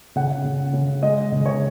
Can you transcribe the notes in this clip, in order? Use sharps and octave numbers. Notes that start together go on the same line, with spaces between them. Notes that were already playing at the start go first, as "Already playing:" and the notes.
C#3 F#5
C#3
C#3
G#3 D#5
C#3
C#5